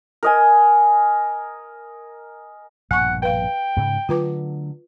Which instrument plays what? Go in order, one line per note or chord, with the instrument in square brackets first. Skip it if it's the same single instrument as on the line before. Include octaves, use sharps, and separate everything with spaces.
[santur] A#4 D#5 G#5
[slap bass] A#1 G2 B2 [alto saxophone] F#5 [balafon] G#5 C#6
[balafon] B4 F5 [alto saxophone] G5
[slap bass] G#2 C#3
[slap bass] D3 F#3 A3 [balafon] F4 B4 D6